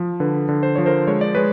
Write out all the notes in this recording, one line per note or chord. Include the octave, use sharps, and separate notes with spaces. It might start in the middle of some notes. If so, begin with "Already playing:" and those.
Already playing: F3
D3 B4
D3
C5
F3 C#5
A#4 C5
G#3 C#5
D5
G#3 B4 C#5